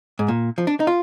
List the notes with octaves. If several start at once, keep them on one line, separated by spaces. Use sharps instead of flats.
G#2
A#2
F3
D4
D#4
F4